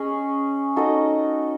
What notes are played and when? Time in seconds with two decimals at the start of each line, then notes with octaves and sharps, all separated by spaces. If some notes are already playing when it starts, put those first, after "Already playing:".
Already playing: C#4 G#4 D#5
0.76 D#4 F#4 A4 D#5